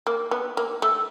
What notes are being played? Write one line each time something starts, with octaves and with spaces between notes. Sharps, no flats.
A#3
B3
A#3
A3